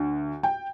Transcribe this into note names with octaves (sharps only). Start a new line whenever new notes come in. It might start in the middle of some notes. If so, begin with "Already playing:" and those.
Already playing: D2
G5